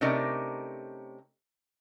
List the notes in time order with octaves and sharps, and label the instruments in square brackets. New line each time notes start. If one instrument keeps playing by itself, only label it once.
[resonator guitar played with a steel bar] C3 A3 C#4 D#4 A#4 D5